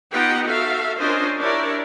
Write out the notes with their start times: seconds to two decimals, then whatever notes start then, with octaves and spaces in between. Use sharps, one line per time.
0.11 B3 D#4 F4 G4 F#5 G5
0.47 F#4 A4 E5 F5
0.98 C#4 D4 F4 A#4 C5 D#5
1.40 D4 E4 G4 A#4 C#5 D5